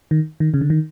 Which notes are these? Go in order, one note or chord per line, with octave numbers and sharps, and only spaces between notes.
D#3
D#3
C#3
D3
D#3